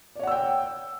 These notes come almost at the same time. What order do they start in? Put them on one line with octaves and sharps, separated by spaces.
D5 C#5 F#5 E6 G5